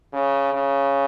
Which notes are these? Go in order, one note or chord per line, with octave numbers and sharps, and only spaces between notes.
C#3
C#3